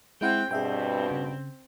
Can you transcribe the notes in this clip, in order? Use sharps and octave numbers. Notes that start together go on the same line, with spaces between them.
G#3 C4 E4 F#5 G5
G2 B2 C4 G#4 E5 G5
C#3